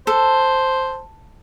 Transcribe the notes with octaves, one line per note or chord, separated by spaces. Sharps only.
A4 C5